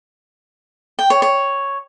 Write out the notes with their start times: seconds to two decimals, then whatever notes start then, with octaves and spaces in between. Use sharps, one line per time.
0.99 G5
1.10 C#5
1.22 C#5